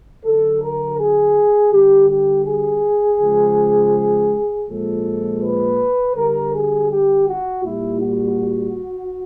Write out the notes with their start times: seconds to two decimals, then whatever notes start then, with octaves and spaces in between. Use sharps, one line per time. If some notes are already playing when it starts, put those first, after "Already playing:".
0.25 D3 F#3 A4
0.62 A#4
0.99 G#4
1.73 D3 G3 G4
2.10 G4
2.46 G#4
3.20 C#3 F3 G#3
4.68 A#2 F3 G#3 A4
5.43 B4
6.16 D3 G3 A#4
6.53 G#4
6.91 G4
7.28 F#4
7.64 A#2 G3 E4
8.01 F#4